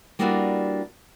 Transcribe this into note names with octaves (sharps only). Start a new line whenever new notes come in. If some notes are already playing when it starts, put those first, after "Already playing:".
G3 A#3 B3 D4 E4 F#4